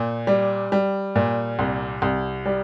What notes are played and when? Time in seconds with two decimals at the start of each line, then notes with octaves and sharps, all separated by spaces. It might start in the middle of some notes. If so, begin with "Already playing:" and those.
Already playing: A#2
0.27 G3
0.72 G3
1.16 A#2
1.59 C2
2.02 C2
2.46 G3